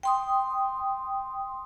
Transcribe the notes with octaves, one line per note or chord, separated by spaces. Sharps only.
G5 C6 D#6